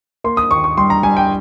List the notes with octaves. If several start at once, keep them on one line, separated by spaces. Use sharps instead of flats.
A#3 C6
D#6
D#2 C#6
C#6
G3 C6
A#5
G3 G#5
G5